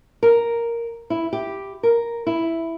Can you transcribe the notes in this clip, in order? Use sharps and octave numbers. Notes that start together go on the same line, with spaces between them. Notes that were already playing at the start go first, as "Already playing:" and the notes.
A#4
E4
G4
A#4
E4